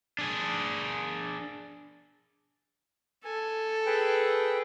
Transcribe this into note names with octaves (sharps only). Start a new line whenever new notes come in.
D4 G#4
A4 G#5
G#4 B4 G5